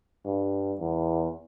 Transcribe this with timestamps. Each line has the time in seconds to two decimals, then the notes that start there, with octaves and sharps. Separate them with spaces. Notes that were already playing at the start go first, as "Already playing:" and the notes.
0.26 G2
0.80 E2